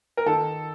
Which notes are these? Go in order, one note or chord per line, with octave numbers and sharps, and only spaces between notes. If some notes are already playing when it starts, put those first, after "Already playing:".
A#4
D#3 A4